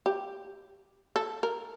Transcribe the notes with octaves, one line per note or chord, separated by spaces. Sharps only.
G4
A4
A#4